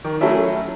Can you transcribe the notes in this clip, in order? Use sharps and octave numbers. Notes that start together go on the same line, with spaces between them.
D#3
F#3 A3 C#4 E4